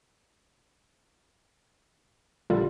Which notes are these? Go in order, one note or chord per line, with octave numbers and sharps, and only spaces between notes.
A#1 D3 G3 F4